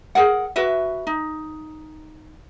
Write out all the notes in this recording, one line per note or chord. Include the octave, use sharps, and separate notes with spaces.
G#4 A#4 F#5
F#4 B4 E5
D#4